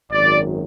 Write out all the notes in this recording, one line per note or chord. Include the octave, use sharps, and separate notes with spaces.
G#1 F#2 D#3 D5